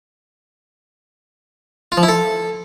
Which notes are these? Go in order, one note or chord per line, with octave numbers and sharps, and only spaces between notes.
F4
F3
E4
A4